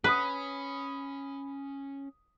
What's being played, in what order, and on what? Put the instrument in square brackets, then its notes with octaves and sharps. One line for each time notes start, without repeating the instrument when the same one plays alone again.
[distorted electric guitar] C#4 [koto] B4 [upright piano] B5 D#6